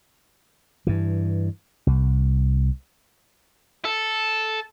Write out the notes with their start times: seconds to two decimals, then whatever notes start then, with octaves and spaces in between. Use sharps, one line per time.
0.87 G2 E3
1.87 C2
3.85 A4